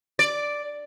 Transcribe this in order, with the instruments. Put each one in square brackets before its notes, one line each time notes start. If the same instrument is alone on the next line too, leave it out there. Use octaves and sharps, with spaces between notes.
[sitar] D5